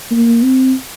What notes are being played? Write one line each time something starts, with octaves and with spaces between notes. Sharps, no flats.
A#3
C4